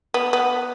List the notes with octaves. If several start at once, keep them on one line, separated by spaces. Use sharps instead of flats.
B3
B3